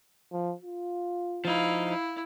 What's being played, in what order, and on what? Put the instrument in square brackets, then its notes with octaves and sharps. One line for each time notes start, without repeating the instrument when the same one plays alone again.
[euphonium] F3
F4
[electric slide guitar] F3 D#4 [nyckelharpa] E4 F5
[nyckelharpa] E4